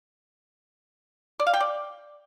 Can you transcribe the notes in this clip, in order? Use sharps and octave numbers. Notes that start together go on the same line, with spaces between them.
D5
F5
G5
D5